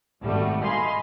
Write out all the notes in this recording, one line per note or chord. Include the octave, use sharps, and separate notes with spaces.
G#1 B2 G3 A3 F#4
D#5 F5 G#5 B5 C6